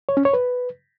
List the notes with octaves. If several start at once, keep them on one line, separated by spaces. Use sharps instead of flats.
C#5
C#4
C#5
B4